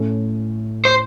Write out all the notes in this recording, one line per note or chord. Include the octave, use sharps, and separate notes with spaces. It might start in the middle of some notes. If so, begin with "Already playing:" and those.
Already playing: A2 A3 C#4 A4
C5